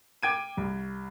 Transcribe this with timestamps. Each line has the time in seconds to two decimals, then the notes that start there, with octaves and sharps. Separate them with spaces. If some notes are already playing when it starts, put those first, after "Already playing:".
0.23 G5 D6 G#6 D7 D#7
0.57 C2